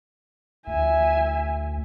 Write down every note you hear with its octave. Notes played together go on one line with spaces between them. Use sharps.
D2 E5 G#5